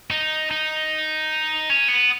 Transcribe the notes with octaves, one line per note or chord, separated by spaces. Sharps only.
D#4
D#4
C#4
B3